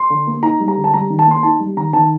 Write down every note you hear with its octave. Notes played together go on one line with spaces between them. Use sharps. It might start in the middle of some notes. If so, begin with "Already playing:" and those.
Already playing: C6
D3
A#3
D#4 A#5
G3
A#5
D3
A5
G3 A#5
D#3
A5
A#3 C6
D#4 A5
G3
D#3 A#5
D#3 A5